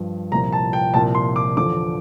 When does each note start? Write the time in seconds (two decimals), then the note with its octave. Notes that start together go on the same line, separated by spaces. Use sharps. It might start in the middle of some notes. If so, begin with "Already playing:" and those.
Already playing: G2 F3
0.32 C2 A#2 F3 A#5
0.53 A5
0.73 G5
0.94 C2 A#2 F3 A5
1.15 C6
1.36 D6
1.56 E2 D3 F3 D6